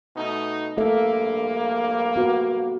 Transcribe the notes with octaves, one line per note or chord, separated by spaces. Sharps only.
B2 A3 D#4
A#1 G2 A3 A#3 A4 E5
B3 F#4 B4